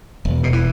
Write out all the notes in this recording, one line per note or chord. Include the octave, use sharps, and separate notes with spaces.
E1
B2
E3